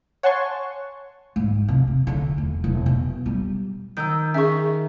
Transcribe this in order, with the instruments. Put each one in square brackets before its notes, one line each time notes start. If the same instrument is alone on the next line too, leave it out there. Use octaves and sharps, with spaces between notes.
[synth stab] C#5 F#5 G#5 A5 C6 C#6
[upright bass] G#2
C3
C3
D3
E1
E1
B2
G3
[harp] D#3 [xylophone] E6 G6
[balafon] C#4 G#4 [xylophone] E5 C#6